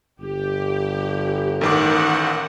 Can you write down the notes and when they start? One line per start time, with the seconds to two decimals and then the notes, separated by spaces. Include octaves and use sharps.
0.20 G1 G4
1.61 A1 D#3 A#4 F#5 D6